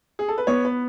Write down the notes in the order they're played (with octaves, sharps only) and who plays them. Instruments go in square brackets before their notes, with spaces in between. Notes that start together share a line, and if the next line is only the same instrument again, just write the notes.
[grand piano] G#4
A4
B4
[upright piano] B3 [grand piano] C#5
[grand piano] B4